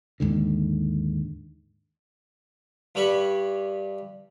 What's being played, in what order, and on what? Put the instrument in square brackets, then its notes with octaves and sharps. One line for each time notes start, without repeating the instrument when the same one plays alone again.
[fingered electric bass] D#2 G#2 D3
[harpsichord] G2 G3 B5 C#6